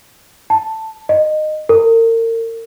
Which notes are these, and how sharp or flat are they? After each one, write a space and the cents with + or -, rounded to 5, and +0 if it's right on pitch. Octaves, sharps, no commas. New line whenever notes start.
A5 +10
D#5 -20
A#4 -35